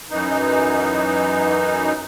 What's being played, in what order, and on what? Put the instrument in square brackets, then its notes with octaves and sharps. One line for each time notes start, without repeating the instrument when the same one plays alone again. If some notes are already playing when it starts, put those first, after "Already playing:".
[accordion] F#2 E3 D#4